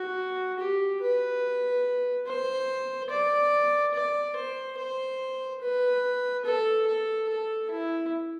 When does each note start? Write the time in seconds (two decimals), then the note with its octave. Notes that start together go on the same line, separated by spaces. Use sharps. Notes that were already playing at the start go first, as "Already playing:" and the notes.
Already playing: F#4
0.59 G4
1.01 B4
2.27 C5
3.10 D5
3.94 D5
4.36 C5
4.77 C5
5.62 B4
6.45 A4
6.87 A4
7.29 A4
7.70 E4